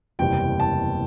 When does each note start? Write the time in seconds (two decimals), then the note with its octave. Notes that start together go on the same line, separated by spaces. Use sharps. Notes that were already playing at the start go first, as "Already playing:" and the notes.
0.19 F#1 E2 C3 G3 G5
0.60 A5